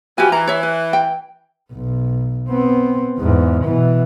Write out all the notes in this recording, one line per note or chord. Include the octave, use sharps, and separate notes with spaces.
E3 F3 F#4 G4 G#5
E3 A#5
C#5 E5
B4
G5
B1
B3 C4
E2 G#2
B2 E3